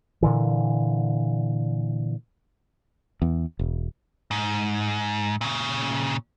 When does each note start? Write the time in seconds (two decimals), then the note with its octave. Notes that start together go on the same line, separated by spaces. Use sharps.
0.22 A#2 D3 E3
3.22 E2
3.59 E1
4.31 G#2
5.41 A#2 C#3